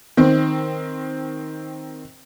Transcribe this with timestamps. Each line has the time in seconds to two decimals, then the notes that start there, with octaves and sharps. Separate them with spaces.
0.17 D#3 C4